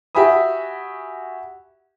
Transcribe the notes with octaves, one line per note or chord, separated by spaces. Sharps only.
F#4 G4 E5 G#5 B5 D#6